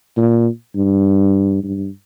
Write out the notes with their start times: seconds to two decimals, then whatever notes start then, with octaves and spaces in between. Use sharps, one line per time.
0.17 A#2
0.75 G2
1.63 G2